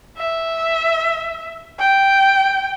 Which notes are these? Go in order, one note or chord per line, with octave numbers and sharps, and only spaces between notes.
E5
G5